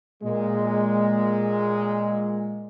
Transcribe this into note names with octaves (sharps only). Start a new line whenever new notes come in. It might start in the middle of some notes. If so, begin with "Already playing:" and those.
A#2 G#3